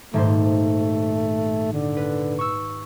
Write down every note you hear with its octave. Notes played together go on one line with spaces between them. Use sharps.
D#1 G#2 A3 C5
D3
B4
C#6 E6